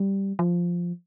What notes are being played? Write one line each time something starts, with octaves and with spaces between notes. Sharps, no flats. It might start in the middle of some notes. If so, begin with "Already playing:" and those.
Already playing: G3
F3